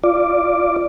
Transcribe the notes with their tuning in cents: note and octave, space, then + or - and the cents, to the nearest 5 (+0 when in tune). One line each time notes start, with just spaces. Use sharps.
F4 -20 D5 +0